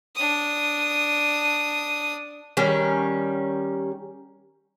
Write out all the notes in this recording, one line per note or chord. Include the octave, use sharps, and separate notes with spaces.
D4 D#6
D#3 G3 C#4